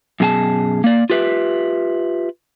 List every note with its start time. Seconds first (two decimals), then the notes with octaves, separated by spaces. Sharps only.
0.20 F#2 B2 G#4 G#5 A5
0.84 A#3 D5
1.10 F4 G4 B4 E5